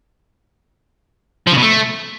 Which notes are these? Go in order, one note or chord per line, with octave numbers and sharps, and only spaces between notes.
F3
C#3
B2
A3